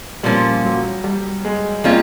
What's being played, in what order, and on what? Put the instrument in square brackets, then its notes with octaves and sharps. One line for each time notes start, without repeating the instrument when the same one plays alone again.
[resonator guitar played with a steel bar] A#2 F3 A#3 C#4 [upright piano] G3
[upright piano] F#3
G3
G#3
[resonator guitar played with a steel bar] G3 A#3 C#4 F4 [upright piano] G#3